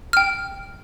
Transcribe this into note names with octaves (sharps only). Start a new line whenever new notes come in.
G5 F6